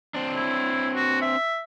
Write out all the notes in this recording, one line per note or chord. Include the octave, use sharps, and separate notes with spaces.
C4 D4
E4
F#4
E5